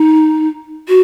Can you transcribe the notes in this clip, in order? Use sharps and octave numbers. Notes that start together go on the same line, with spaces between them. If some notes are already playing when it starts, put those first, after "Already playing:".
Already playing: D#4
F#4